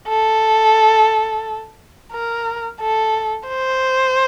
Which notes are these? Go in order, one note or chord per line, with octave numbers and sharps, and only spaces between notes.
A4
A#4
A4
C5